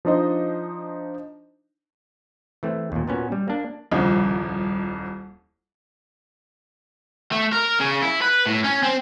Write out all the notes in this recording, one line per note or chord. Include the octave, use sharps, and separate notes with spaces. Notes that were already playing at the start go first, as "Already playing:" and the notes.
F3 D4 D#4 C5 D#5
E3 A3 C4
D#2 A#2
A#2 B3 C#4 F#4
G3
A#3 D4
D#1 C2 F2 C#3
A3
A#4
C#3
E4
B4
A2
C#4
C4